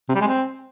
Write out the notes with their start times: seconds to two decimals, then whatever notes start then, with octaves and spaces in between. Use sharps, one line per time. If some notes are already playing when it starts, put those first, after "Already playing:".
0.09 C3
0.15 G3
0.21 G#3
0.27 C4